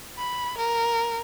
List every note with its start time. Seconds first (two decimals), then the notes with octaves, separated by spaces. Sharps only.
0.18 B5
0.58 A#4